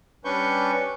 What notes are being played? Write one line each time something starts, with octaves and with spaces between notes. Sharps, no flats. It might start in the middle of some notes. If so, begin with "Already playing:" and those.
G3 C#4 D4 B4 C#6 G6